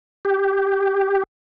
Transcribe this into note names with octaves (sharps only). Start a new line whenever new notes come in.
G4